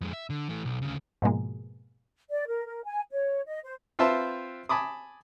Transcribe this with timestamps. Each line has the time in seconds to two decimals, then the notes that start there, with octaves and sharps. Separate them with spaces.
0.01 F2 G#3
0.13 E5
0.30 D3
0.49 E3 A3
0.65 B1
0.82 D2 C#3
1.22 G#2 B2 F3 G#3 A#3
2.30 D5
2.47 A#4
2.66 A#4
2.85 G#5
3.11 C#5
3.47 D#5
3.64 C5
3.99 C4 F4 B4 C5 E5 A5
4.69 G#5 A5 B5 D6 D#6